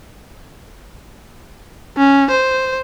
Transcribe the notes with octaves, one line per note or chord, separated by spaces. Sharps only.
C#4
C5